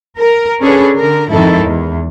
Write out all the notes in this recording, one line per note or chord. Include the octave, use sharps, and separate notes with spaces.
A#4
C#4 D4 G#4 A4 B4 C#5
D3 A#4
F2 G#2 D#3 D#4 E4 A4
E2